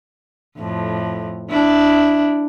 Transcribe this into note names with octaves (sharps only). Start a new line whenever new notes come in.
F2 A2
D4 E4